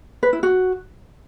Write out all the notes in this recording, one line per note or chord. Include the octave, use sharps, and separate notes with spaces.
B4
E4
F#4